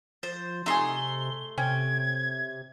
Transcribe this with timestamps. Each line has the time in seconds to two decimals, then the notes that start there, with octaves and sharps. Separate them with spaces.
0.23 F3 C5 A6
0.66 C3 A3 D#4 G#4 C6 G7
1.58 C3 C#4 G5 G#6